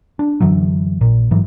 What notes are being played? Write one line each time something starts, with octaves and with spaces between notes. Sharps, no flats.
D4
F#2 D3 E3 F#3
A#1 A#2
G#2 E3 F#3